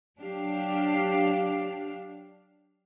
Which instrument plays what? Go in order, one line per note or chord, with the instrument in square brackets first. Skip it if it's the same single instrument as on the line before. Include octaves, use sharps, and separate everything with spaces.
[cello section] F#3 D4 G4 F5